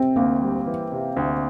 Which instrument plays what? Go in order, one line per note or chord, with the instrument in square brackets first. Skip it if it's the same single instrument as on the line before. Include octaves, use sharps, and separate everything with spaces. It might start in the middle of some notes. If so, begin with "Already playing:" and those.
Already playing: [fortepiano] C3 [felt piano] C4
[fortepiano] D2 [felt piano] A#3
[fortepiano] G3
E3
C3
D2